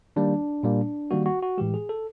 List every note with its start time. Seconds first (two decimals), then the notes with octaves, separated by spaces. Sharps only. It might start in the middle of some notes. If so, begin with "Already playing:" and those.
0.16 D#3 G3 A#3 D4
0.63 A#2 G3 A#3
1.11 D#3 G3 A#3 F#4
1.26 F#4
1.42 F#4
1.58 A2 E3 G#3 G4
1.74 G#4
1.89 A4